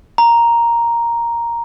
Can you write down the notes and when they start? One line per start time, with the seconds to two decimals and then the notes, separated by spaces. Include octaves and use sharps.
0.18 A#5